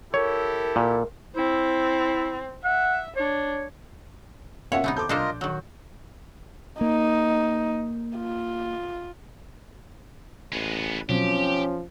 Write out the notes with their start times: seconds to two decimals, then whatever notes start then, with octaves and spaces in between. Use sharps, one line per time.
0.14 E4 G4 A4 A#4 C#5
0.76 A#2
1.37 C4 E4
2.64 E5 F#5
3.16 D4 C#5
4.72 B2 A#3 C#4 F4 C#5 E5 F#5
4.84 C2 C3 A3 B3 D#4
4.97 D#2 A4 C5 D6 G6
5.09 C2 D4 F4 A4 A#4 C5 D#5
5.29 A#1
5.41 D#3 F#3 F#4
6.81 A#3 D#4
8.18 F4
10.53 A1 G#3 B3
11.09 B2 F3 F#3 C4 C#4 G4